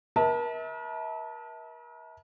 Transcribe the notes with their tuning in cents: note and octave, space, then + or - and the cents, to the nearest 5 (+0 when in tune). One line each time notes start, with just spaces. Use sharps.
A#4 +40 E5 -40 A5 +0